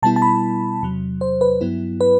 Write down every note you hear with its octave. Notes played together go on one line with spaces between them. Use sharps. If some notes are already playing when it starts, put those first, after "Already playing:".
B2 G3 B3 E4 A5
A5
B5
E2 C3 F#3
C5
B4
G2 F#3 B3 E4
B4